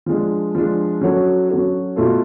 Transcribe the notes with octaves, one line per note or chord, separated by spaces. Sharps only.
F3 G#3 D4
F3 G#3 D4
F#3 C#4 F#4 A4 C#5
F#3 C#4 F#4 A4 C#5
B2 A3 F4 A4